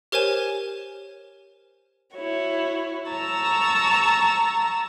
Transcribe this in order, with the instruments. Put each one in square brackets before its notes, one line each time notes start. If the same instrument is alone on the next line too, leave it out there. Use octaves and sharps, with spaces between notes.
[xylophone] G4 A#4 C5 C#5 G#5 E7
[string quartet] E4 F#4 C#5
A5 A#5 C#6 E6